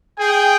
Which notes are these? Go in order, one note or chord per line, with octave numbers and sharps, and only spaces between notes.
G#4 G5